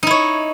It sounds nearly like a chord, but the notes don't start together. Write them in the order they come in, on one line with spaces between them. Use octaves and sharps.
D#4 E4 C#5